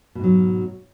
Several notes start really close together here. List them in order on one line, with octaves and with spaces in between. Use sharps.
B2 G#2 F#3